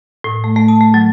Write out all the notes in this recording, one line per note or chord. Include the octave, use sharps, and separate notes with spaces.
A2
A3
A3
A5
A3
F#3